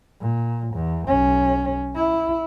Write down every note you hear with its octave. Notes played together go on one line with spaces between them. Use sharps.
A#2
E2
B1 C#4
E4